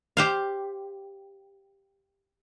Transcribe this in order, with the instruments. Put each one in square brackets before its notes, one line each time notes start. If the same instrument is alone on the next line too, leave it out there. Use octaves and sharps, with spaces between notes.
[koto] G4 C5 F5